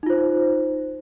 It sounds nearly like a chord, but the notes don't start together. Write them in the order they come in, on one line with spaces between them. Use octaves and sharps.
D#4 F4 C5